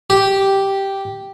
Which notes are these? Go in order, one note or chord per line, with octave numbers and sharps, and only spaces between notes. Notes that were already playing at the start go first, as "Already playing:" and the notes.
G4